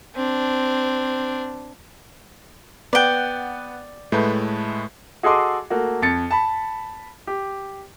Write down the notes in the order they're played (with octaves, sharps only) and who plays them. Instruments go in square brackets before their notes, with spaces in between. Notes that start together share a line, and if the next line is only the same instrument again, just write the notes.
[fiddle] C4 D4
[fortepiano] B3 F#5 [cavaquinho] D5 G5
[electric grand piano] A2 G#3 G6 [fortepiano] A3 B4
[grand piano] F#4 G#4 A4 D#5 C6 D6
A3 A#3 F#4
F2 A6 C#7
A5 B5
G4